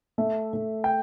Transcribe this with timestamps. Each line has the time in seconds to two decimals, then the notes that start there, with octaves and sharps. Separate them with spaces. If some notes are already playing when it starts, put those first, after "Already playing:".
0.18 A3 E5
0.53 A3
0.84 G5